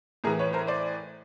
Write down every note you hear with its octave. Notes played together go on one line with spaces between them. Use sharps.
A2 E3 G#4 A#4
B4 C#5
A#4 C5
C5 D5